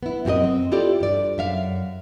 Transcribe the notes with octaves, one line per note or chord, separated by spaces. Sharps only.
B3 E4
F#2 C4 F4 G4 A#4 D#5
C4
E4 F4 G4 A4 D5
G2 D5
F#2 E5 F5